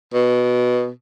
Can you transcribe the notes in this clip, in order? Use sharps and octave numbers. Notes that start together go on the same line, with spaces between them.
B2